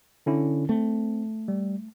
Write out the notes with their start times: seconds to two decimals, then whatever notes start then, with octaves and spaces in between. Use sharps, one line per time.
0.26 D3 C#4 E4
0.69 A3 C4
1.48 G3